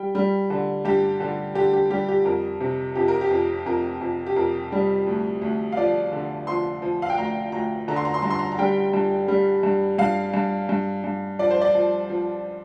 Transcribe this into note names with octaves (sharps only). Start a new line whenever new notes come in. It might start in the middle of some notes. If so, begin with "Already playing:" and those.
Already playing: G3 G5
G3
D3
G2 G4
D3
D3 G4
G4
G3 G4
G4
F2 A#4
C3
F2 G4
A#4
G4
F2
F2 A#4
F2
G4
F2 A#4
G3
D2
D2
F5
F3 D5
D3
F3 C6
F3
F5
G5
D2 A#5
D2 A#5
D3 A#5
C6
A#5
C6
G2 A#5
C6
A#5
A#5
G3 G5
G2
G3
G2
G2 F5
G2
G2
G2
F3 D5
C5
D5
F3
F3